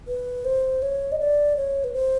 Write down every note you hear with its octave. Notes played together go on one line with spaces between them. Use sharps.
B4
C5
C#5
D#5
D5
C#5
B4
C5